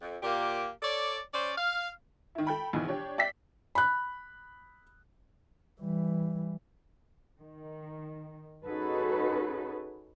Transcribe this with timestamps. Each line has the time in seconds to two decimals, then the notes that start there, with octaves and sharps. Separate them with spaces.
0.02 F2
0.23 A#2 A#3 G4
0.83 A4 C#5 D5
1.34 C#4 C5 D5
1.57 F5
2.35 D#3 E4
2.47 A4 G5 B5
2.73 A#1 B2 D#3 E3
2.88 D4 G4 C#5
3.18 D5 E5 G5 E6 B6 C7
3.75 B5 F#6
5.80 E3 G3
7.40 D#3
8.65 C#4 D#4 F#4 G#4 A4 B4